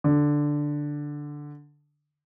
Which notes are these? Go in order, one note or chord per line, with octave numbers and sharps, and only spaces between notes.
D3